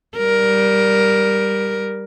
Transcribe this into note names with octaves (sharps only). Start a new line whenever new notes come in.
G3 A#4